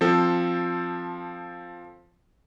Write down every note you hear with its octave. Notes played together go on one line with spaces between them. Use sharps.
F3 C4 A4